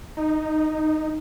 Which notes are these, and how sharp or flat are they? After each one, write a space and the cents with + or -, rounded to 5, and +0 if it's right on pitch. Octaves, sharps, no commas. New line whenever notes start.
D#4 -5